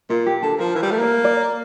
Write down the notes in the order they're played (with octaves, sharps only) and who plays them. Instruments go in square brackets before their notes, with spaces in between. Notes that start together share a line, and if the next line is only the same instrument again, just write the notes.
[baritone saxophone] A#2 [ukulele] F4
[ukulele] G4
[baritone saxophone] D3 [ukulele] A4
[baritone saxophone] F3 [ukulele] A#4
[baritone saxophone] E3 [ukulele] A#4
[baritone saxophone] G3
A3
A#3
[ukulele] D5